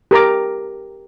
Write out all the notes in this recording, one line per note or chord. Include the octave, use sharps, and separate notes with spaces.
G4 A#4 A#5 D6